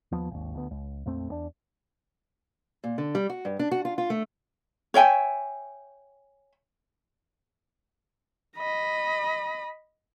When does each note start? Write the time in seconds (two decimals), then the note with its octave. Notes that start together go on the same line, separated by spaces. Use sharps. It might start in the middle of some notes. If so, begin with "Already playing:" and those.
0.12 D#2 F3 B3
0.31 G#1 D#2
0.55 D2 B3
0.71 C#2
1.06 A#1 F2 A3 C4
1.28 E2 B3 D4
2.84 A#2
2.98 D3
3.15 G3
3.29 F#4
3.45 G2
3.59 D4
3.71 F#4
3.85 F4
3.98 F4
4.10 A3
4.94 C#5 E5 G5 G#5
8.57 D#5 B5